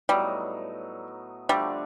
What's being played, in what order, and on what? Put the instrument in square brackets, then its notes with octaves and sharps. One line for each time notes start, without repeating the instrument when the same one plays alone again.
[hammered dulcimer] A2 F#3 B3 D#4 [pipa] G3
[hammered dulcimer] D3 F3 A3 D4 [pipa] G3